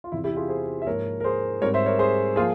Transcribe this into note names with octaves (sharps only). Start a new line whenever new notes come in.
F4
E2 C3 E3 E4
E4 G4
F4 G#4
G#4 C5
E5
G#2 F3 A#3 A#4 C#5
A#4
G#4 C5
G#2 G3 C4 A#4 C#5
C5 E5
A#4 C#5
G#4 C5
F3 A#3 F4 G#4